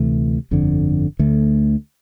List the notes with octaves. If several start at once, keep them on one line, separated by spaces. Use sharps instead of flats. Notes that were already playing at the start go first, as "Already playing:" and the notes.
Already playing: D2 C3 E3 A3
G1 F2 D3
D2 D3 A3